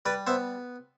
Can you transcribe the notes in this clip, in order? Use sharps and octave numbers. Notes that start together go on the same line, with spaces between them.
G3 B4 D5
B3 C5 E5